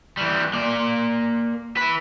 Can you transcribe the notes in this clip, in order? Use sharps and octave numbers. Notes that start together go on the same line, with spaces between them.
E3 G3
A#3 D5
E4 B4